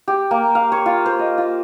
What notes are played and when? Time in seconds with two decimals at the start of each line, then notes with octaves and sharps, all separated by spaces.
0.08 G4
0.31 A#3
0.55 F5
0.72 C#5
0.86 F4
1.06 C5
1.19 D#5
1.38 F4